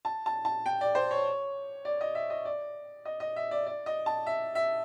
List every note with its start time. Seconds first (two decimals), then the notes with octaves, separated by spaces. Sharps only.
0.05 A5
0.26 A5
0.45 A5
0.66 G5
0.81 D5
0.95 C5
1.11 C#5
1.85 D5
2.01 D#5
2.15 E5
2.30 D#5
2.45 D5
3.05 D#5
3.20 D#5
3.36 E5
3.51 D5
3.66 D5
3.86 D#5
4.06 A5
4.26 E5
4.55 E5